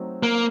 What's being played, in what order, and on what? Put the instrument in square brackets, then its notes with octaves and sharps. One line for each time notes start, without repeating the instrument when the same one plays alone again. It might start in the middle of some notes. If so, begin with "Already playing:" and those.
Already playing: [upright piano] F#3 A3 C4 D#4
[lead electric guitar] A#3